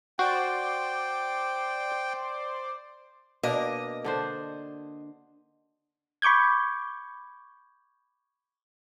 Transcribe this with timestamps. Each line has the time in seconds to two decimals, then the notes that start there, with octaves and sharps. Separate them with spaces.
0.19 F#4 C5 D5 G5
3.43 B2 A#3 D4 D#5
4.04 D3 D4 C5
6.22 B5 C#6 D6 G6 G#6